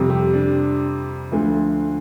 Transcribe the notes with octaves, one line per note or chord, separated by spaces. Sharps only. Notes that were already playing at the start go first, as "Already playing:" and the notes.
Already playing: F2 C3 G3
G4
D4
D2 D3 F3 A3